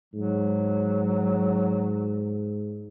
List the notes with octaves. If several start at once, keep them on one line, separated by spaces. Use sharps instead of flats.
G#2 F#3